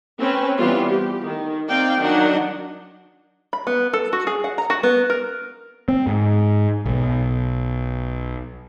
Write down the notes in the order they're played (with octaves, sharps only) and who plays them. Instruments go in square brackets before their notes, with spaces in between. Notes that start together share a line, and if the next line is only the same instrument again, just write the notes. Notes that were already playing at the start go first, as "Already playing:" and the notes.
[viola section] C4 C#4 B4
E3 G3 B3 C4 F4
G4
D#3
C4 D#4 D5 F5 G5
D#3 F#3 D4 D#4 F#5
[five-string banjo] B5
B3
A4
F#4
G#4
F#5
A#5
F#4
B3
A#4
[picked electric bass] C4
G#2
B1